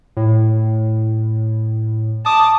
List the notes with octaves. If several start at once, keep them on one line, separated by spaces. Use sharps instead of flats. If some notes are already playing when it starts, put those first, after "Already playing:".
A2
A5 D6 D#6